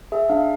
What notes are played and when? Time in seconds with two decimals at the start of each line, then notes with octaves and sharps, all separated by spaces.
0.12 G#4 E5
0.29 D4 F5